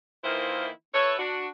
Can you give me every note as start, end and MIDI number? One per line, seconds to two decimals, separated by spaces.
0.23 0.68 51
0.23 0.68 52
0.23 0.68 58
0.23 0.68 64
0.23 0.68 65
0.23 0.68 72
0.93 1.15 64
0.93 1.15 69
0.93 1.15 71
0.93 1.15 73
1.18 1.47 62
1.18 1.47 66